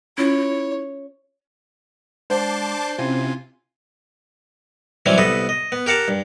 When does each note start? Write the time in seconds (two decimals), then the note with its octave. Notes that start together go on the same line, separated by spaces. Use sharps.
0.18 C#4 E4 F4 C#5
2.30 G#3 D4 C5 F#5 A5 D6 G6 C7
2.98 C3 C4 C#4 E4 F4 G#5
5.06 E3 F#3 G3 C4 C#4
5.18 C2 B3 A4 D#5 B5
5.49 D#5
5.72 B3
5.86 G4 A#4 F#5 A5
6.08 G2